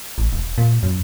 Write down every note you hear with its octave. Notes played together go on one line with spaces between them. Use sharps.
A1
E1
A#2
F#2